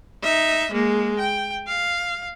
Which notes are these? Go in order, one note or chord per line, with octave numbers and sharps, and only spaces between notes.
D#4 E5
G#3 A#3
G5
F5